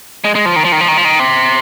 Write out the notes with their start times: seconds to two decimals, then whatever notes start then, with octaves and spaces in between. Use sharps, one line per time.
0.24 G#3
0.35 G#3
0.45 F3
0.56 D#3
0.65 F3
0.72 D#3
0.81 F3
0.88 D#3
0.97 F3
1.05 D#3
1.20 C3